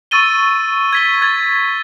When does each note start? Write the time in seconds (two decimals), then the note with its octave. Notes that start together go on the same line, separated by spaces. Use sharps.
0.11 C#6 E6 A6 D#7 G7
0.93 G#6 B6 G7
1.22 G#6 A6